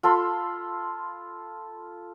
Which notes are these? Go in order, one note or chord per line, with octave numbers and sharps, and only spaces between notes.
F4 A4 B5 C6